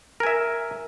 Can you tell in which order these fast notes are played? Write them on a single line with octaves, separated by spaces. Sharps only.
A#4 G#5 E5